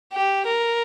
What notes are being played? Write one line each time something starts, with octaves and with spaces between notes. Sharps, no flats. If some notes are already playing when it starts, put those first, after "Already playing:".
G4
A#4